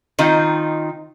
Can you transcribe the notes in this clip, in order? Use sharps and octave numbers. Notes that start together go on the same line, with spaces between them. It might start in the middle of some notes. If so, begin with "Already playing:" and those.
D#3 C4 D#4 F4